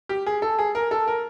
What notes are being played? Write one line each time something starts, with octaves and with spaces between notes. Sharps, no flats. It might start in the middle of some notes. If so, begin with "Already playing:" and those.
G4
G#4
A4
G#4
A#4
A4
A#4